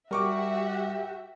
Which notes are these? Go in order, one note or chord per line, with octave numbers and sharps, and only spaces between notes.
G3 F#4 G4 A#4 E5 C#6 D6